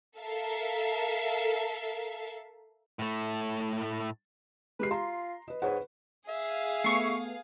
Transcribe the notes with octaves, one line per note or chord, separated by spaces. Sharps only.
A4 A#4 E5 F5
A2 A3
G#3 G4 B4 C7
F4 A#5 C6
B4 D#5
G#2 B4 C#5 F#5
G#4 E5 F5
A3 B3 C#6 C7